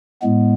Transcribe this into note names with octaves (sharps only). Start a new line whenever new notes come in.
A2 G#3 B3